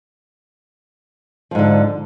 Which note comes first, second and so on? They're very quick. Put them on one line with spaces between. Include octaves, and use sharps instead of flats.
F3 G#2 D3